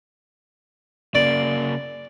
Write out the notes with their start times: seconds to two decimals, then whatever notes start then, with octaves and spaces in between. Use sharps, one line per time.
1.15 C#3 A#3 D5